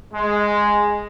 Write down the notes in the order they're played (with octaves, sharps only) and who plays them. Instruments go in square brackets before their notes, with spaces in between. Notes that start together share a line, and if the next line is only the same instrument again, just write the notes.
[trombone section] G#3